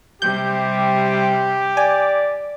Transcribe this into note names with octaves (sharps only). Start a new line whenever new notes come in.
C3 G3 G4 G6
D5 G#5